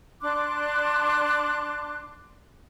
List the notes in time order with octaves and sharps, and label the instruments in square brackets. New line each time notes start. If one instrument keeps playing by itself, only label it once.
[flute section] D4 C6 D6 F#6